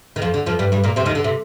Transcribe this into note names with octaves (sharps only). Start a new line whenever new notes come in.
D#3
F2 F3
D3
F2 F3
G2 G3
G2 G3
A#2 A#3
C3 C4
D#2 D#3
D3
C3